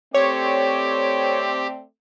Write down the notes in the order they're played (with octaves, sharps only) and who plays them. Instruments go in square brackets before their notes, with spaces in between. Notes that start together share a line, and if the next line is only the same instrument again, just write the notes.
[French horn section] A3 C4 D5 [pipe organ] G4 [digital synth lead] C#5